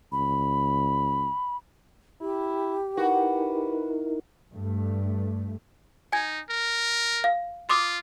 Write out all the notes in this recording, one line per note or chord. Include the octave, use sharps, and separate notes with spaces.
C#2 B5
E4 G4
D#4 E4 F#4 A#4 B4
G2 A3
D#4 G#5 G#6
A#4
F5
F4 C6 D6 D#6